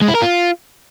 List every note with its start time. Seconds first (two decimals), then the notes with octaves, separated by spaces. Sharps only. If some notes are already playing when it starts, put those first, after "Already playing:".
0.01 G#3
0.08 E4
0.15 A#4
0.22 F4